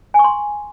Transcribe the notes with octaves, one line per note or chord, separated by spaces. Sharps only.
G#5
C#6
C6